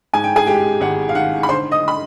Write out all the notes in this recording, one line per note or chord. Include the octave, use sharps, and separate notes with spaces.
G#2 G#5
G5
G#4 G#5
G#3 G4 G5
G#1 F#5
F5
D#3 F#5
B5
D3 C5 C6
D#5 D#6
B5